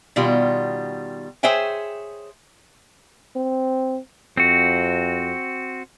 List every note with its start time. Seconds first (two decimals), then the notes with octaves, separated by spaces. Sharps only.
0.16 B2 D#3 G3 F4
1.43 G#4 C5 C#5 E5 G5 G#5
3.36 C4
4.37 F2 C4 F#4